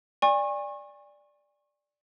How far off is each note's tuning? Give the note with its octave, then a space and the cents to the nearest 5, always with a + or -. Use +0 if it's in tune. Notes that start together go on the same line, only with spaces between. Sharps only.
D5 +0 G#5 -40 C#6 -30